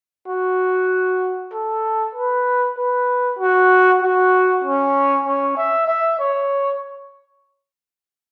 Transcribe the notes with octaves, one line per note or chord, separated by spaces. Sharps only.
F#4
A4
B4
B4
F#4
F#4
C#4
C#4
E5
E5
C#5